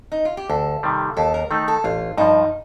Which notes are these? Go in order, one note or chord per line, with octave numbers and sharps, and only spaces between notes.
D#4
F4
G4
D2 A4
C3 D#3 G3
D#2 A4
A#4
D#3 A3 D#4 A4
A4
A1 F4
G2 F3 D#4